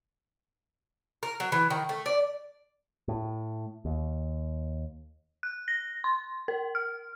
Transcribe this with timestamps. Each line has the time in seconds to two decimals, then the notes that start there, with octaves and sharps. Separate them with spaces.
1.23 A#4
1.40 F#3
1.52 E3
1.70 D#3
1.89 A3
2.06 D5
3.08 A2
3.85 D#2
5.43 F#6
5.68 A#6
6.04 C6
6.48 A#4
6.75 F6